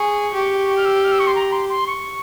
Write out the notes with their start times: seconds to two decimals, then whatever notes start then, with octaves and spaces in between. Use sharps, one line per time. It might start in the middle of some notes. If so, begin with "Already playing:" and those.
Already playing: G#4 C#6
0.33 G4
0.77 F6
0.85 E6
1.04 F6
1.12 E6
1.19 C#6
1.27 C6
1.35 A#5
1.52 C6
1.69 C6
1.87 C#6